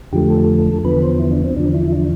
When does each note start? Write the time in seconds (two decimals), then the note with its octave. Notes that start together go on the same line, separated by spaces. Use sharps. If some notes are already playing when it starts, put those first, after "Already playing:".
0.12 F2 D3 F3 A3 G4
0.30 A4
0.84 E2 D3 F3 B3 B4
1.02 C5
1.19 E4
1.32 D4
1.44 C4
1.56 E2 D3 F3 D4
1.74 E4
1.85 E4
1.92 D4